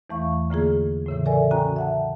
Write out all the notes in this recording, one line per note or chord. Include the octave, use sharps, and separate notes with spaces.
E2 E3 A3 F5 C#6
D3 A#3 F4 G#4
A2 C#3 E3
A4 A#4 D5 E5 G#5
C#4 F#4 G5 G#5 A#5
E5 F#5 A5